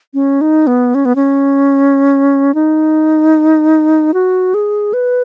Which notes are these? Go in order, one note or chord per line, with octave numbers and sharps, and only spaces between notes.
C#4
D#4
B3
C#4
B3
C#4
D#4
F#4
G#4
B4